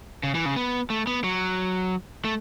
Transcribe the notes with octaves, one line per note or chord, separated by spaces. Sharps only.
C#3
E3
C#3
B3
A3
B3
F#3
A3